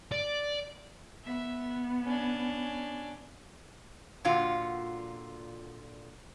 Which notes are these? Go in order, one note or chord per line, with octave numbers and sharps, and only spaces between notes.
D5
B3 E5
C#4 D4
A#2 D3 F4 F#4